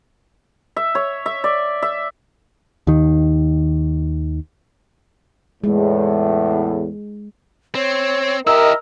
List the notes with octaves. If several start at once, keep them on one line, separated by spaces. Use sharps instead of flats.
E5
C#5
E5
D5
E5
D#2 D#3
E2 A2 G#3
C4 C#5
E4 G4 A#4 D#5 E5 E6